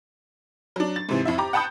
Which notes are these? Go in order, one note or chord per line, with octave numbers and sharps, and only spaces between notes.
F#3 D4
A6
G#2 C3 E3
F2 E4 E5
G4 A#5 D6
F#5 G5 A5 B5 D#6 G6